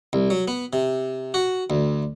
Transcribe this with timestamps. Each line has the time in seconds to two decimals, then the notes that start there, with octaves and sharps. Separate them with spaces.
0.13 C2
0.30 F#3
0.48 B3
0.73 C3
1.34 F#4
1.70 D2